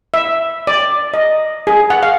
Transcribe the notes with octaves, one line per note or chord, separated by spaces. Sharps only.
E5
D5
D#5
G#4
F#5
F5